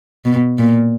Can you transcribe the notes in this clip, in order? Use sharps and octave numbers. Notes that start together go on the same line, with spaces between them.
B2
A#2